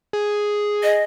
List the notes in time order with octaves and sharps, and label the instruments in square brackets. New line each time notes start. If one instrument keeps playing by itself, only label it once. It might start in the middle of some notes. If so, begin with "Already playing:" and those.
[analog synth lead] G#4
[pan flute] D#5